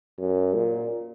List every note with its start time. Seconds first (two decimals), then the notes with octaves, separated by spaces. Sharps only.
0.19 F#2
0.55 A#2